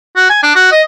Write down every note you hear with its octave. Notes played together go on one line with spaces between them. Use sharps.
F#4
G#5
D4
F#4
D#5